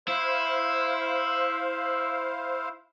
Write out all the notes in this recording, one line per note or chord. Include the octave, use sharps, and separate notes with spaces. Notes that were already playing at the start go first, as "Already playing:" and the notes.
E4 C5 F5